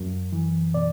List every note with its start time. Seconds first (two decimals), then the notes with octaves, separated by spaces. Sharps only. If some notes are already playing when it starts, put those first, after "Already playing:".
Already playing: F#2
0.32 E3
0.74 B2 D5